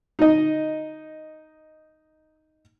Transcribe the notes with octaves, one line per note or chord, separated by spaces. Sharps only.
D#4 D#5